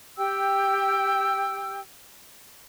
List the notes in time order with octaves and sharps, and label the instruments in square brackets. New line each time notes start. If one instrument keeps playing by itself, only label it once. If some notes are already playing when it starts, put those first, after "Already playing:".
[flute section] G4 G5 E6